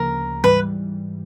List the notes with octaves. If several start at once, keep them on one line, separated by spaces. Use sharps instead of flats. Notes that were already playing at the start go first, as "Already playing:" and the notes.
Already playing: D2 C#3 F3 A#3 A#4
G#2 E3 G3 B4